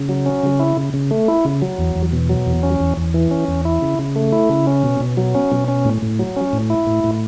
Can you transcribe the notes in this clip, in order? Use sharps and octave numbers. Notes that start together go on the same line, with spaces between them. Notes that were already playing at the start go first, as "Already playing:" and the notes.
Already playing: C#3
F#3
C#4
C#3
E4
C#3
C#3
A3
E4
C#3
F#3
E2
E2
B2
F#3
E2
C#4
E2
E2
E3
C#4
E2
E4
C#3
C#3
A3
E4
C#3
C#4
B2
B2
F#3
C#4
B2
C#4
A2
A2
F#3
C#4
A2
E4
A2
A2